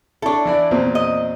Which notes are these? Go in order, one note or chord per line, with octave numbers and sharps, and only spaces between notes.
D4 E4 A4 C#6
E3 E4 D5
E2 A#2 C4
D#5